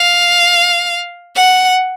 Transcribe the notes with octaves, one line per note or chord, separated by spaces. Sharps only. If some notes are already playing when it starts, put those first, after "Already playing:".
Already playing: F5
F#5